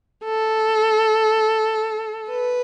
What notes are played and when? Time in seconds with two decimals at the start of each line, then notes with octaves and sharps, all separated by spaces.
0.25 A4
2.31 B4